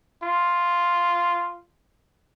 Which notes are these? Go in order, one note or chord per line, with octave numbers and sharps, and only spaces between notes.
F4